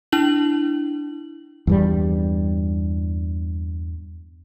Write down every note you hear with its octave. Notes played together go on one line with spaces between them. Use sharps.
D4 E4 F#7
E2 G2 G3